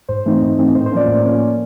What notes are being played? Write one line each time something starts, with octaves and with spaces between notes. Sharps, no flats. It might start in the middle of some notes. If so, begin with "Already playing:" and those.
G#2 C5
E3 A3 C4 D#4
G#2
E3 A3 C4 D#4
A2 C5
C5
F3 A#3 C#4 D5
A2
F3 A#3 C#4